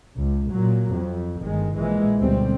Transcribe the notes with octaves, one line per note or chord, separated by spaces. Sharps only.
C#2
A#2 F#3
F2
G1 D#3 G#3
A#1 A#2 E3 G#3
D2 B2 G3 C4